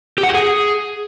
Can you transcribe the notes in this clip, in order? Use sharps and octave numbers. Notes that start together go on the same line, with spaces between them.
G4
F#5
G4
G#4